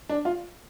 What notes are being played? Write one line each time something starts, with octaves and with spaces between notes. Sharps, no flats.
D4
F4